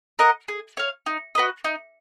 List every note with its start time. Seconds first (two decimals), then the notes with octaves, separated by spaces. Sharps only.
0.19 A#4 D#5 F#5
0.48 G#4
0.77 C#5 F5
1.06 D#4
1.35 F#4 B4 D#5
1.64 D#4